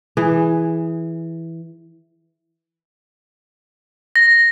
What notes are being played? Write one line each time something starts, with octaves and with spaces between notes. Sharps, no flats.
E3 G#4
A#6